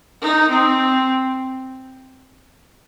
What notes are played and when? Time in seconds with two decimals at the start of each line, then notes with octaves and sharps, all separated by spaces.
0.22 D#4
0.50 C4